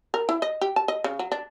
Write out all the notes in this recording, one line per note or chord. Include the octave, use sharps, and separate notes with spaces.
A#4
E4
D#5
G4
A5
D#5
C#3
F#3
D4